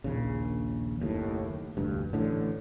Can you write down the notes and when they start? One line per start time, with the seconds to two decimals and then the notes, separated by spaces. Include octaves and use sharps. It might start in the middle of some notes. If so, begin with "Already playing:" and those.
0.04 A#1 D#2 C#3
1.00 F#1 D#2 A2
1.77 F1 D2 G2
2.13 A1 A2 D3